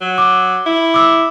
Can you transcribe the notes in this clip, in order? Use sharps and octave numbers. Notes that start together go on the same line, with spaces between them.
F#3
D6
E4
D6 E6